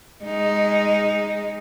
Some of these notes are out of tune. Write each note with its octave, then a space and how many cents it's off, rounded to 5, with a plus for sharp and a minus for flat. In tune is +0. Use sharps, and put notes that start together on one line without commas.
G#3 -20 D#4 +0